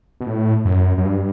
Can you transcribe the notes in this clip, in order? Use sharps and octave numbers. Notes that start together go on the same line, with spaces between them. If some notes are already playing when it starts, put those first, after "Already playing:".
B2
A2
F#2
F#2
G2